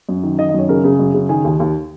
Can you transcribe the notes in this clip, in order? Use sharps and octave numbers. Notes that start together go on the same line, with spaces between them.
F#2
D#3
D#3 D#5
D#5
F#2 C#5
C#3 A#4
C#3
F#2
C#3
D#3 G#4
D#2
D#2